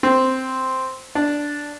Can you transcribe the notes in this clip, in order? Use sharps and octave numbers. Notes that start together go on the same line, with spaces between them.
C4
D4